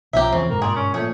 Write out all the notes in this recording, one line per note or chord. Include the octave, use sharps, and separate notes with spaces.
B1 B2 F3 C#4 G4 A#4 E5
E2 C#3 C4
G1 G#2 B2 A#3 A#4
A#2 G#4
C#4
A#2 F3 A3 G#4 C#5